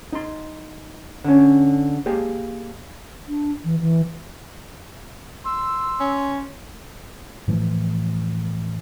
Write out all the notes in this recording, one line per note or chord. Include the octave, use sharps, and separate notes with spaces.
D#4 C6
D3 C#4
A#3 G4 G#4
D4
E3
E3
C6 E6
C#4
A2 E3 F3 A3